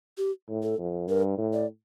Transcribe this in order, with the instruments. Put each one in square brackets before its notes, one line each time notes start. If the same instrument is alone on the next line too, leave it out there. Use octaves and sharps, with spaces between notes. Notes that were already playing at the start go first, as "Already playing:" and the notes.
[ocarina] G4
[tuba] A2
[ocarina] A4
[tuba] F2
[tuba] G2 [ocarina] A#4
[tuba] A2
[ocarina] D5